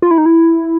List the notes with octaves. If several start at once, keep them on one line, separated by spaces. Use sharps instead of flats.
F4
E4
D#4
E4